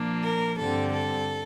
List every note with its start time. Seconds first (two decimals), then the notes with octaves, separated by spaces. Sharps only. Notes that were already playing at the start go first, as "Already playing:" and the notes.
Already playing: A#2 F3 A#3 D4
0.24 A#4
0.58 G2 D3 G3 C4 A4
0.93 A4